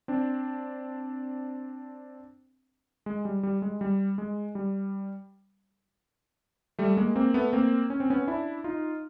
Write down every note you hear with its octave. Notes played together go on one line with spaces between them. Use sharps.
C4 D4
G#3
G3
G3
G#3
G3
G#3
G3
G3 A3
G#3 A#3
A#3 C4
A3 B3
A#3 C4
C#4
C4
B3 C#4
D4 E4
D#4 F4